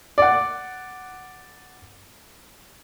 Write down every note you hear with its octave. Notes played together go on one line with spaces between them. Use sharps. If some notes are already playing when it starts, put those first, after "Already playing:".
D5 F#5